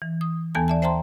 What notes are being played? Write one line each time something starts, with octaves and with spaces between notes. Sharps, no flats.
E3
D#6
D#2 E3 B3 A4 G#5 A5
D5 E5 A5
C5 E5 G5 A5 A#5 C6